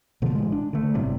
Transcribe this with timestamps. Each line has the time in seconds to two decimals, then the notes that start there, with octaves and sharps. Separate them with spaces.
0.22 B2 D3 F3
0.35 A1 G#3
0.52 D4
0.73 D3 A3
0.94 G1 A2 C3 G3